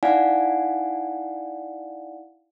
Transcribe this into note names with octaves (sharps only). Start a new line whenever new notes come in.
D#4 E4 D5 F5 F#5 G#5